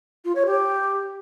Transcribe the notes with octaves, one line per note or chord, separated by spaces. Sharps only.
F4
C#5
G4